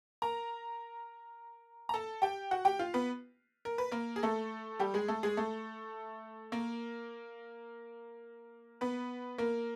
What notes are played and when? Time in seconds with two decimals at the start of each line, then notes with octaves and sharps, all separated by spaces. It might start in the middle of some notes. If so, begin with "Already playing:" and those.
0.22 A#4 A#5
1.89 A#5
1.94 A4 A5
2.22 G4 G5
2.51 F#4 F#5
2.65 G4 G5
2.79 F4 F5
2.94 B3 B4
3.65 A#4
3.78 B4
3.92 A#3 A#4
4.16 G#4
4.23 A3 A4
4.79 G3 G4
4.94 G#3 G#4
5.08 A3 A4
5.23 G#3 G#4
5.37 A3 A4
6.52 A#3 A#4
8.81 B3 B4
9.38 A#3 A#4